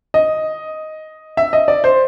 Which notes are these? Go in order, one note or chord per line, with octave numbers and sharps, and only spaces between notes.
D#5
E5
D#5
D5
C5